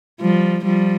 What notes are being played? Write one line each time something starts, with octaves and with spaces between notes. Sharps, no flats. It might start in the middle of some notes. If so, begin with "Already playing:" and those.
F3 G3
F3 G3